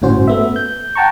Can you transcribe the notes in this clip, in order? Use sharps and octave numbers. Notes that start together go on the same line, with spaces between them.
G1 A2 C#4 F#4 C5
A3 B3 E5
G6
F#5 G5 A5 A#5 C#6